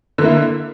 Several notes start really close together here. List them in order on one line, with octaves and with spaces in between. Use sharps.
D3 A#3 E4